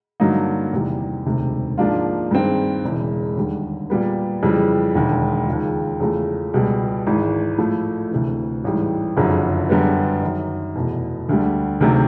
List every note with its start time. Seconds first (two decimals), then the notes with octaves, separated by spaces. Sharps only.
0.20 G2 D3 F#3 A#3 D#4
0.73 E2 C3 D#3 G3
1.25 E1 D2 C3 D#3
1.78 G#2 F3 A#3 D4 F4
2.31 G2 D#3 G#3 C4
2.84 E1 E2 C#3
3.37 D#2 D3 G3
3.90 A#2 G3 B3
4.43 F2 C#3 E3 G3
4.95 E1 D#2 D3
5.48 D#2 C#3 F3
6.00 E2 C#3 F3 A3
6.54 C#2 B2 G3
7.07 G#1 G#2 E3
7.58 A2 F3 A3
8.11 D2 C3 E3
8.64 A1 G#2 E3 G3
9.17 F#1 F2 D3 F#3
9.69 F#2 D3 G3 B3
10.23 F#2 D#3 F#3
10.75 F1 E2 B2
11.29 D2 D3 G3
11.81 D2 C3 D#3 F#3